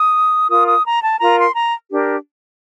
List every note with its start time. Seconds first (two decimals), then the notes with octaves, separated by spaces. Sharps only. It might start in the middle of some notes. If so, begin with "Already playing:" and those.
Already playing: D#6
0.50 F4 A#4 D#6
0.67 D#6
0.85 A#5
1.03 A5
1.20 F4 A#4 A#5
1.38 C6
1.55 A#5
1.91 D4 G4 A#4